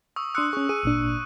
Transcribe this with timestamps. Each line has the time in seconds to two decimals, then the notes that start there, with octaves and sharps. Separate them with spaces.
0.16 C#6 D#6 E6
0.34 D4 C6 D#6 E6 F#6 C#7
0.53 C#4 G#4 C#6
0.69 G#4 D#7
0.83 G#1 A#2 D4